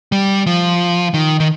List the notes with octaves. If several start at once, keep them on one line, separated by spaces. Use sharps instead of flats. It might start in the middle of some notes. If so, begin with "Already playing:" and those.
G3
F3
D#3
D#3